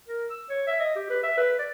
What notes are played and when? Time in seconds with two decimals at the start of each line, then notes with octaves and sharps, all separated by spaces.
0.08 A#4
0.30 E6
0.50 C#5
0.67 E5
0.80 D#5
0.96 G4
1.10 B4
1.23 E5
1.37 B4
1.59 D5